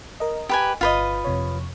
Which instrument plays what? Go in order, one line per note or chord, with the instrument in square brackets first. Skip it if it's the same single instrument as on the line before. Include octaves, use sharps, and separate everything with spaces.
[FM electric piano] A#4 D#5
[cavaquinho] G4 B4 G#5
[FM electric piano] G1 [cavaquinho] F4 B4 D#5
[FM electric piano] F2 C3 C#5